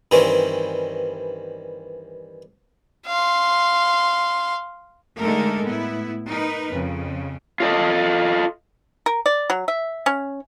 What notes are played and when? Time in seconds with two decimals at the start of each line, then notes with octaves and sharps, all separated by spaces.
0.11 G2 D#3 E3 C4 C#4
3.07 F5 C6
5.20 D3 G#3 A3 D#4 A4 A#4
5.64 A2 B3 E4
6.28 D#4 A#4 B4
6.73 F2 C#3
7.60 F4 A4 D#5
9.06 A#4
9.26 D5
9.50 F#3
9.68 E5
10.06 C#4